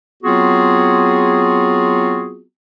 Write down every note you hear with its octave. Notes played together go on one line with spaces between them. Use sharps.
F#3 B3 C4 F4 F#4 G#4